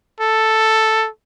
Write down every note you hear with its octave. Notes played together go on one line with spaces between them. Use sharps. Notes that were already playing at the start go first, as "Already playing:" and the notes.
A4